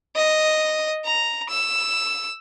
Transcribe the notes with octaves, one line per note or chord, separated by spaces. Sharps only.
D#5
A#5
E6